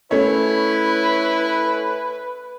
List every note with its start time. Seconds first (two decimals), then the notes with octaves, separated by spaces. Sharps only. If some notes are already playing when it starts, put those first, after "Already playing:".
0.11 A3 C#4 E4 B4 C#5